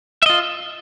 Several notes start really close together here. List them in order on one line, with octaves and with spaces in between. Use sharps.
E5 D#5 F4